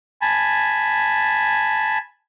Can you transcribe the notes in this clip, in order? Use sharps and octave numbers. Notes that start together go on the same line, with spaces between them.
G#5 A5 B5